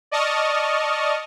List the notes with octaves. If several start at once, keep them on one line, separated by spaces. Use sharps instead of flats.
D5 D#5 A5 C#6 D#6 F6